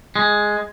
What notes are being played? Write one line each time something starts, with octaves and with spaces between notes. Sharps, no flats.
G#3